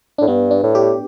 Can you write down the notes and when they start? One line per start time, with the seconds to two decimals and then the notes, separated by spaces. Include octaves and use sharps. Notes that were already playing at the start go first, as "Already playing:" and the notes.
0.18 A2 D4
0.27 G2 B3
0.51 D4
0.63 A2
0.75 G4